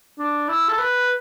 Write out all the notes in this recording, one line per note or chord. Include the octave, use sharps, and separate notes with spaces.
D4
E4
A4
B4